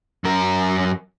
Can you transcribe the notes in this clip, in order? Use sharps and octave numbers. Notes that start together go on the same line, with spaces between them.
F#2 A#4